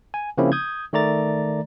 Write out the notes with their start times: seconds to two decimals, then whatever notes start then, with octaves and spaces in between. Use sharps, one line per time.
0.14 G#5
0.38 C#3 F3 A#3 C4 C#4 E4
0.52 D#6 G6 G#6
0.93 D#3 A3 D5 A#5 A6